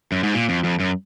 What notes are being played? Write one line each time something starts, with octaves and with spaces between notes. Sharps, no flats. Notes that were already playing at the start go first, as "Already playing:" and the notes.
F#2
G#2
A#2
F2
F2
F#2